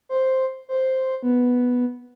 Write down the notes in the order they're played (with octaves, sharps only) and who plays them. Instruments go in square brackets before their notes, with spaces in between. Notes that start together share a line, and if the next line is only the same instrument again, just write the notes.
[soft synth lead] C5
C5
B3